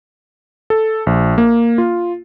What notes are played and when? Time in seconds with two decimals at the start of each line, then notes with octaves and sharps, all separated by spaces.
0.70 A4
1.07 A#1
1.38 A#3
1.78 F4